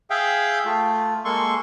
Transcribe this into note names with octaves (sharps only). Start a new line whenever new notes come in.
G#4 E5 F5 G5
A3 F4
G#3 A#3 A4 C6 C#6